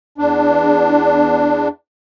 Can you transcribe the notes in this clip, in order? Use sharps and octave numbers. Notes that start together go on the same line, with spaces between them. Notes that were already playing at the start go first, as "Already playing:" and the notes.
E2 D4